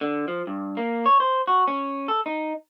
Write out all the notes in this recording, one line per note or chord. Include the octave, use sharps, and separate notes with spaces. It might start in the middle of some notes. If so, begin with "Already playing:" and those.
D3
F3
G2
A#3
C#5
C5
F#4
C#4
A4
D#4